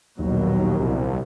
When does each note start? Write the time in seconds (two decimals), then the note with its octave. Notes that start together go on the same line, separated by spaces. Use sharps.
0.19 A#1 D#2 B2 F#3
0.80 C2